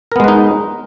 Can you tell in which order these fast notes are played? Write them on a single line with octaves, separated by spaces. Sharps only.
A#4 B3 G#3 B4 D#4